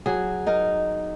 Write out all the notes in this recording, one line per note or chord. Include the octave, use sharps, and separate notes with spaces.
F#3 G#4
D#4 A#4